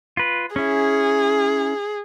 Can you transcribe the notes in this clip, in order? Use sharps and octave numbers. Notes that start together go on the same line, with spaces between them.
F4 B4
C#4 E4 G#4